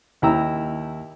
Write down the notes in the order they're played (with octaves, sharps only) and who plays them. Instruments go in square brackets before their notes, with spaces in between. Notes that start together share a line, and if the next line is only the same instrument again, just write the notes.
[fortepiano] D#2 E4 G5 A#5 E6